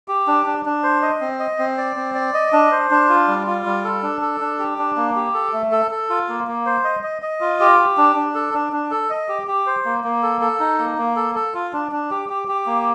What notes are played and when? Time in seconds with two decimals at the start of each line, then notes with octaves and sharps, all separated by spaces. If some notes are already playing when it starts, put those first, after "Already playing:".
0.08 G4
0.27 D4
0.46 D4
0.65 D4
0.83 C5
1.02 D#5
1.21 C4
1.39 D#5
1.59 C4
1.78 D5
1.96 C4
2.15 D5
2.34 D#5
2.53 D4
2.71 C5
2.91 D4
3.09 F4
3.28 G3
3.47 F4
3.66 G3
3.84 A4
4.03 D4
4.21 A4
4.40 D4
4.59 G4
4.78 D4
4.96 A#3
5.16 G4
5.34 A4
5.53 A3
5.72 A4
5.91 A4
6.10 F4
6.29 A#3
6.47 A#3
6.66 C5
6.84 D#5
7.03 D#5
7.22 D#5
7.41 F4
7.60 G4
7.79 G4
7.97 D4
8.16 D4
8.35 A4
8.54 D4
8.73 D4
8.91 A4
9.10 D#5
9.29 G4
9.47 G4
9.66 C5
9.85 A#3
10.04 A#3
10.23 A4
10.41 A4
10.60 D#4
10.79 A#3
10.98 A#3
11.16 A4
11.35 A4
11.54 F4
11.73 D4
11.92 D4
12.11 G4
12.29 G4
12.48 G4
12.66 A#3